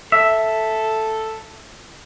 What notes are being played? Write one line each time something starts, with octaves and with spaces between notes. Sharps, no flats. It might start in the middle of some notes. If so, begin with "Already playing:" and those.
A4 E5